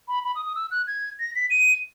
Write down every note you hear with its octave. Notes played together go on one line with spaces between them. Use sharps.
B5
B5
D#6
D#6
E6
F#6
G#6
A#6
B6
D#7